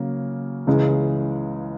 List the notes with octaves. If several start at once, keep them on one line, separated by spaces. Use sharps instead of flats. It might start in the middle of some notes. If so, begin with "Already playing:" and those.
Already playing: C#3 F#3 A#3
C#2 C#3 E3 G#3